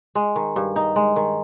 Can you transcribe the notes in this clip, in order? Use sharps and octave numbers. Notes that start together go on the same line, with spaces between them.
G#3
D#3
G2
D#4
G#3
D#3